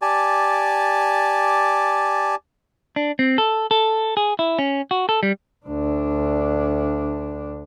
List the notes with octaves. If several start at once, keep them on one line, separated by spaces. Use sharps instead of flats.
G4 D5 G#5 A5
D4
C4
A4
A4
G#4
E4
C#4
F#4
A4
G3
D2 D4